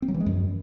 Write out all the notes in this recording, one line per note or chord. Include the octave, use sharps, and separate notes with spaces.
C4
F#3
E3
G#3
F#2